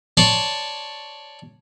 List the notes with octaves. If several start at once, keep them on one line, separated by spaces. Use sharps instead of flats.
C#5 D5 A5 C6